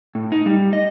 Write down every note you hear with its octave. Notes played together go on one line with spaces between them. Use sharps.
A2
D#4
G3
D#5